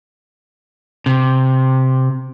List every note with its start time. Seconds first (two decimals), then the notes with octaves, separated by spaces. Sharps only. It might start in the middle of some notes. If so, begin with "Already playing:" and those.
1.06 C3